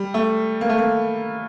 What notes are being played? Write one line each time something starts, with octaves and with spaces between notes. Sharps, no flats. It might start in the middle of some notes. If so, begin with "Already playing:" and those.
Already playing: G3
A3
A#3
A3
A#3